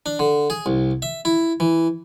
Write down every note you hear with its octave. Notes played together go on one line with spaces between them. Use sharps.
D4
D3
G#4
C2
E5
E4
E3